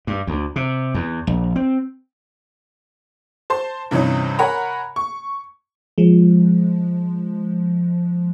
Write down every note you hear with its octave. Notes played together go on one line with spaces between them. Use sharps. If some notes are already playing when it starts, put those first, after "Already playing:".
G2
D2
C3
E2
A#1
C4
C5 A5 C6
G2 C3 E3 C#4 D#4
A#4 C#5 F#5 G#5 A#5 B5
C#6
F3 G#3